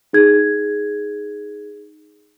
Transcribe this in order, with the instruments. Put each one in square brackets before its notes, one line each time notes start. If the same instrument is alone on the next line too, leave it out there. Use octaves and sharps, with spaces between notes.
[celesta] D#4 G#4 G#6